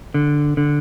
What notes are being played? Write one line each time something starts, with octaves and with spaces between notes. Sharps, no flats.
D3
D3